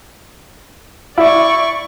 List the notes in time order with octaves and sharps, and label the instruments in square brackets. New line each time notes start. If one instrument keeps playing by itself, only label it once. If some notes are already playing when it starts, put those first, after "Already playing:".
[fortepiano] E4 [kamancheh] D5 C#6